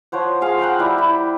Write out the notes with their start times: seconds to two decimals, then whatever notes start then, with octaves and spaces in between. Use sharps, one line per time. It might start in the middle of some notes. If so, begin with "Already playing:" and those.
0.12 F3 C5 C#5 F#5
0.41 F4 G#4 F5
0.59 F#5 G5 A#5 C6
0.79 G3 E4 G4
0.98 E4